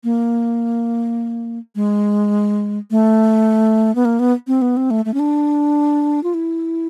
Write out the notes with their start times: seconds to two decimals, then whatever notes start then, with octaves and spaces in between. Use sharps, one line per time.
0.04 A#3
1.75 G#3
2.91 A3
3.95 B3
4.05 A#3
4.19 B3
4.47 C4
4.62 B3
4.77 C4
4.91 A3
5.05 A3
5.14 C#4
5.19 D4
6.23 F4
6.34 E4